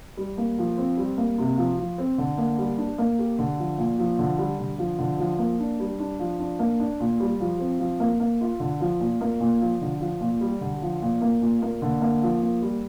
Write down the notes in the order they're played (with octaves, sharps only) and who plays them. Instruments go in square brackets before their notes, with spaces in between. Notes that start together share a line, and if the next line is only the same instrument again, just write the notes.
[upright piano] G3
A#3
F3
C4
G3
A#3
C3
F3
F3
C4
D3
A#3
G3
D4
A#3
G4
D3
F3
A#2
F3
D3
G3
D3
F3
D3
F3
A#3
D4
G3
D4
F3
D4
A#3
D4
A#2
G3
F3
C4
F3
A#3
A#3
F4
D3
F3
A#2
A#3
A#2
F3
D3
F3
A#2
G3
D3
F3
A#2
A#3
A#2
A#3
D3
A#3
F3
A#3
G3